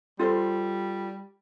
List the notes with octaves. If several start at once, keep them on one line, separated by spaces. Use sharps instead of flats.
G3 F4 A4 C5